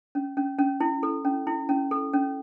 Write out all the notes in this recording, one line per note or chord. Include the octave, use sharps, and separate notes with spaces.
C#4
C#4
C#4
E4
A4
C#4
E4
C#4
A4
C#4